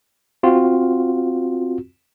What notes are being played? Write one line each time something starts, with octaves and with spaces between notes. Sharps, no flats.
C4 F4 F#4